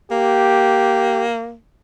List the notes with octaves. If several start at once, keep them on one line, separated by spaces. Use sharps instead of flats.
A#3 G4